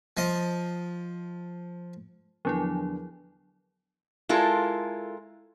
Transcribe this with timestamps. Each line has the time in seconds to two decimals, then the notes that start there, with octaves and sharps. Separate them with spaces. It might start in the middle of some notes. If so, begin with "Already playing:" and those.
0.17 F3 D#5
2.45 E2 D3 F3 F#3 E4
4.29 G#3 E4 F4 A4 A#4